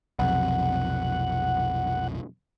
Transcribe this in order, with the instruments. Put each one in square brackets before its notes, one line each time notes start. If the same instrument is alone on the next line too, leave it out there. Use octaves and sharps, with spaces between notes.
[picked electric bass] B1 F2 C3 [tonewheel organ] F#5